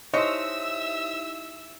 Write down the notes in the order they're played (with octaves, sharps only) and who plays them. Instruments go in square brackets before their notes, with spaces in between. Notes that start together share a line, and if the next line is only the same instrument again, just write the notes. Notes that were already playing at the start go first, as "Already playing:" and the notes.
[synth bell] D#4 E4 G4 [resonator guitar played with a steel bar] C5 C#5 [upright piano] D#5 [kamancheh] E5 E6